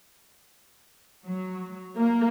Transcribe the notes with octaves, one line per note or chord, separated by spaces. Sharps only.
F#3
A#3